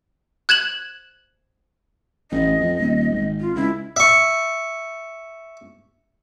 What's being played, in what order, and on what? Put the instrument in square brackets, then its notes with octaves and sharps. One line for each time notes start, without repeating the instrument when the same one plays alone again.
[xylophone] F#6 G#6 E7 F#7
[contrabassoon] A1 [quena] D#5
[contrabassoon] F2
D#1
G#1
[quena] F4
[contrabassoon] C#2 [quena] E4
[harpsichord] E5 C#6